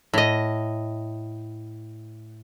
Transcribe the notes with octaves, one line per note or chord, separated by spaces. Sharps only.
A2 D#5